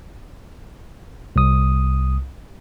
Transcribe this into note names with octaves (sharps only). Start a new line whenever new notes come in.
C2 D#6